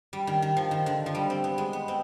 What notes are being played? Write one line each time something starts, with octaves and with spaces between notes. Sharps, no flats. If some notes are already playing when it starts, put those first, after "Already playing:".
G3
D#3
D#3
F3
D#3
D3
F3
G3
C4
B3
G#3
B3
C4